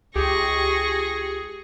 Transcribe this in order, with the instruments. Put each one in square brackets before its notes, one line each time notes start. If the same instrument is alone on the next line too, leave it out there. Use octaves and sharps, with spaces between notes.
[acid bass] C#2 [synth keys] G4 [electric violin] G#4 [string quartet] C#6 A#6